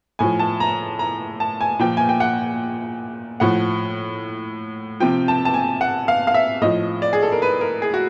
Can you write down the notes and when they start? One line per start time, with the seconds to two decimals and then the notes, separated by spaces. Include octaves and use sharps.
0.19 A2 F3 G#5
0.39 A5
0.60 A#5
0.99 A#5
1.40 A5
1.61 G#5
1.79 A#2 F3 G5
1.97 G#5
2.09 G5
2.20 F#5
3.40 A2 F3 F#5
5.00 C3 F3 G5
5.28 A5
5.45 A5
5.54 G#5
5.81 F#5
6.08 F5
6.27 F5
6.34 E5
6.61 A2 F3 D#5
7.02 D5
7.13 G#4
7.22 A4
7.32 A#4
7.42 B4
7.61 A#4
7.82 G#4
7.94 F#4